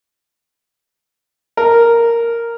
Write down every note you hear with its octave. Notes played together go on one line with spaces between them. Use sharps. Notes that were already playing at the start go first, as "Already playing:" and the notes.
A#4